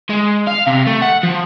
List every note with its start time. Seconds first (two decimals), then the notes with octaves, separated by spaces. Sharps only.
0.10 G#3
0.47 F5
0.67 C3
0.87 A3
1.02 F#5
1.23 F3